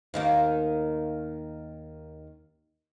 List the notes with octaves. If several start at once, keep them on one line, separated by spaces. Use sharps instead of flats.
D#2 D#3 A#3